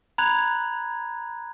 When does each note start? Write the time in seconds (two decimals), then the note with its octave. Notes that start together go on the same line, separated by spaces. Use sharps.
0.18 A#5 B5 F#6 G#6 F7